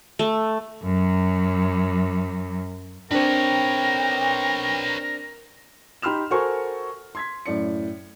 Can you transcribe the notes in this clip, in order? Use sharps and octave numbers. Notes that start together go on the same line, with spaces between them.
A3
F#2 F#3
C4 D4 A#4 B4 C#5 G5
D#4 G4 B5 C6 F6 E7
F#4 A4 A#4 C5 G#5 C#6
C6 G#6 B6
F#2 A2 D5 C#7